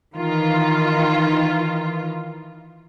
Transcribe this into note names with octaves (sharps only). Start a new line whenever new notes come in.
D#3 E3 F4